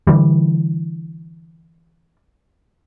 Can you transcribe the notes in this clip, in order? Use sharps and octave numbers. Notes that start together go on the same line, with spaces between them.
D3 E3 G3